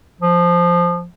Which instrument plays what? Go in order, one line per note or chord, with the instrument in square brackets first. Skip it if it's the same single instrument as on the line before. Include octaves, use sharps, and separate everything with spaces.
[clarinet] F3